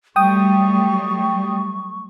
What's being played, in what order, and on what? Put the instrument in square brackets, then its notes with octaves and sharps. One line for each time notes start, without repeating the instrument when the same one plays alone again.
[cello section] F#3 G3 A3 [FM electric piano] G5 D#6 [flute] C#6